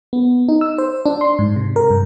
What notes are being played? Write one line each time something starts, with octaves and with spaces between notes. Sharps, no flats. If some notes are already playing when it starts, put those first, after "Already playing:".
B3
D#4
E6
C5
D4
C6
G#2
C3
A#4
G2